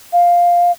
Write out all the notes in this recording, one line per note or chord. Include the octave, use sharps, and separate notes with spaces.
F5